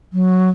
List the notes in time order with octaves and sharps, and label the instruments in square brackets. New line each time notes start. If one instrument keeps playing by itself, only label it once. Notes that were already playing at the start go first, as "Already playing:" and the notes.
[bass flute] F#3